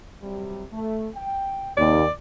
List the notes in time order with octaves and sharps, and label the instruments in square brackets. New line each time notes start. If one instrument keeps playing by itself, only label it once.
[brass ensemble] C3 F#3 G3
A3
G5
[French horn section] D#2 [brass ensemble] C3 [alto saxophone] D5